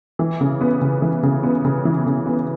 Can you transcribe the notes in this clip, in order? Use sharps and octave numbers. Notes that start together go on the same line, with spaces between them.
E3
C#3
B3
C#3
E3
C#3
B3
C#3
E3
C#3
B3